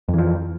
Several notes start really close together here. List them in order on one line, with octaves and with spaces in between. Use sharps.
F2 E3 F3